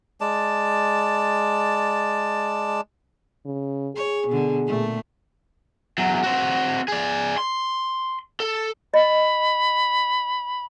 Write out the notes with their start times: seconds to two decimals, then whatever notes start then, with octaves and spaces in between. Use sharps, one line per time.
0.21 G#3 D5 A5
3.46 C#3
3.95 G#4 C#5
4.27 B2 D3
4.66 A#2 A3
5.98 E2 F#3
6.24 C4 F#4
6.88 G#4 D5
7.38 C6
8.40 A4
8.94 D#5 B5